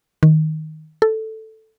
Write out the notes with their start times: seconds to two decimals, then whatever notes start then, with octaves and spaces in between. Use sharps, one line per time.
0.23 D#3
1.02 A4